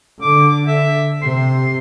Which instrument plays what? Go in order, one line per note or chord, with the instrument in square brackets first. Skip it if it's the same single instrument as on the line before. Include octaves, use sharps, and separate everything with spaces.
[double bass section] D3 [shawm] D6
[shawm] E5
[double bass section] C3 [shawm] C6